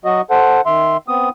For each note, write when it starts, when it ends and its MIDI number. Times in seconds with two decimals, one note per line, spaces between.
0.05 0.21 54
0.05 0.21 66
0.05 0.21 75
0.30 0.61 69
0.30 0.61 72
0.30 0.61 78
0.66 0.97 51
0.66 0.97 76
0.66 0.97 84
1.08 1.29 59
1.08 1.29 60
1.08 1.29 87